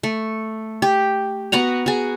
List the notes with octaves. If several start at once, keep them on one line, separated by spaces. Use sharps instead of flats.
A3
G4
B3 F#4 F#5 A#5
F#4 G#4